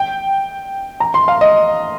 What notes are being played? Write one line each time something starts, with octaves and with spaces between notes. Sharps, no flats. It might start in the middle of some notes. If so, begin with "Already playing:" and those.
Already playing: G5
A#5
C6
F5
D#5